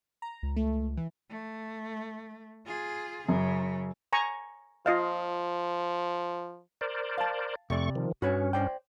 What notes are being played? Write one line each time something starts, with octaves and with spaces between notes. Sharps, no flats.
A#5
C#2
A3
E3
A3
F4 G#4
F#2 C#3
G#5 A#5 C#6
F3 F4 D#5 F5
A#4 C5 D5
F5 A5
F2 C3 A3 D5 C#6
D#3 F3
G2 C#4 F#4 B4 C#5
C5 D5 G5